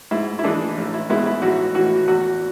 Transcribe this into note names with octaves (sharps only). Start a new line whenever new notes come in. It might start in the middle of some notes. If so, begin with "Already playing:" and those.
G#2 E4
E4
E3 G#3 D4
A1
E4
G#2 G#3 B3 E4
E4
A1 F#4
A2 E3 F#4
E2 F#4